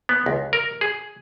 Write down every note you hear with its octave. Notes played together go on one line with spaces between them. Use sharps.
B3
C#2
A#4
G#4